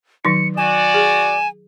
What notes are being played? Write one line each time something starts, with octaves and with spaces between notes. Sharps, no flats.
D#3 F#3 D#4 C#7
F#4 D5 G#5 E7
G#4